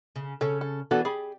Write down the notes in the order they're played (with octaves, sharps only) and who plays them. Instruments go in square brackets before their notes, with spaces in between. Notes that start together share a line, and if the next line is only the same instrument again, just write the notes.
[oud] C#3
[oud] C#3 C#4 [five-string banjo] A4
[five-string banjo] A4
[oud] E3 B3 D4 [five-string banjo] F#4 A4
[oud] G4 [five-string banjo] G#4 B5